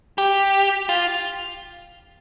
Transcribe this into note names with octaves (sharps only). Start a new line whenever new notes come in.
G4
F4